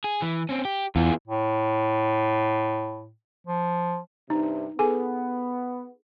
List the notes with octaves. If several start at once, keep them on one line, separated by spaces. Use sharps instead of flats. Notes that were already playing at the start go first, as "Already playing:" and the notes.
G#4
E3
C4 C#4
G4
E2 F4 G#4
A2
F3
G2 C3 D#4
B3 G#4 A4 G#5